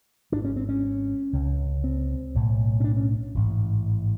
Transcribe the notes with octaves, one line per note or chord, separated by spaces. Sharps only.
G#1 G#2 D4
C#4
C4
C#4
C#2 C3
C4
B1 A2
C#4
D4
C#4
A1 G#2